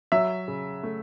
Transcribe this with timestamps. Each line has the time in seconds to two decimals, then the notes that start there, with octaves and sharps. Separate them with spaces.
0.12 F#3 E5
0.48 C#3
0.83 A3